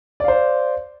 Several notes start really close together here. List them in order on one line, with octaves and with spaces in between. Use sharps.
D5 F5 C5